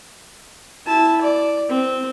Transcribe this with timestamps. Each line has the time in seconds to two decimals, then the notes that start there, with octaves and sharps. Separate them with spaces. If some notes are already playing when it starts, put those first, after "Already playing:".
0.86 E4 A5
1.22 D5
1.69 C4